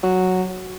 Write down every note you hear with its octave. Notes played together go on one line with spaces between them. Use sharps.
F#3